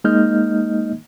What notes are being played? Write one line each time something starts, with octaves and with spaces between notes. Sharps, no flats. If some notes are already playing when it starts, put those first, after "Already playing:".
G#3 A#3 D#4 D#5 F6 G6